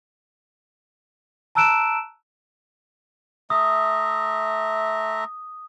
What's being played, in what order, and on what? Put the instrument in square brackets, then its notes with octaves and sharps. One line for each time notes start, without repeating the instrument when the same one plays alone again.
[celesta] A5 A#5 E6 F#6 D7 E7
[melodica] A3 E5 A#5 [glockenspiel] D#6